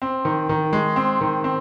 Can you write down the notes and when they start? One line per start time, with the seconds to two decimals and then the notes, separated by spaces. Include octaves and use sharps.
0.02 C4
0.25 D#3
0.49 D#3
0.73 G#3
0.96 C4
1.21 D#3
1.44 C4